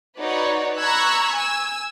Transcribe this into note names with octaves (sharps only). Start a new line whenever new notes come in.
D#4 F#4 B4 C#5 D5
A#5 B5 C#6 E6 F#6 G#6
G#5 E6